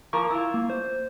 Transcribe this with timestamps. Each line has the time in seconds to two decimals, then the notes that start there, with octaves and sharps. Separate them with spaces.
0.13 F3 A#3 A#4 C#6
0.30 E4 F4
0.54 A#3
0.70 C5